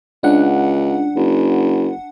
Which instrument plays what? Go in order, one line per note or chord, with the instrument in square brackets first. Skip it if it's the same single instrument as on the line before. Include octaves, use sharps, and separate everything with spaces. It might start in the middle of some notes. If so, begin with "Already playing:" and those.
[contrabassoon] C#2 [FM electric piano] D4 F#5
[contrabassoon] F#1